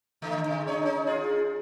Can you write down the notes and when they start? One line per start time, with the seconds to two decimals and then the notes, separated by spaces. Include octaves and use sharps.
0.22 D3 A3 D#4
0.46 G#2 C3
0.67 D4 D#4 C#5
0.82 C#4 D#4
1.07 F4 G#4